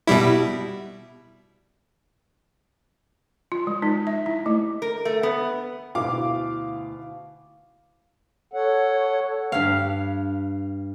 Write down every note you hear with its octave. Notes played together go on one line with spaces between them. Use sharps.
B2 G3 E4
F4
G#3
D#4
E5
E4
A3
A#4
A3
B3
D2 B2 E4 F5 D6
A4 C#5 F#5
G2 F5